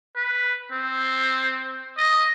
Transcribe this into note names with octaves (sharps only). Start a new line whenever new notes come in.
B4
C4
D#5